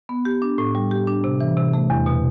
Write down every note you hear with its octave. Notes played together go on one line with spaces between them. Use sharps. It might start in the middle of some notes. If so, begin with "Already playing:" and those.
B3
G4
D4
A2
G3
G4
D4
C3
E3
C3
A3
E2
B2